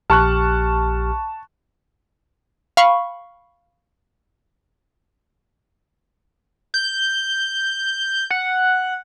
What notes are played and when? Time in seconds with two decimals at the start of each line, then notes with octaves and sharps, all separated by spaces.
0.10 A#1 G4 A5 C#6 F6 F#6
2.77 F5 B5 C#6
6.74 G6
8.30 F#5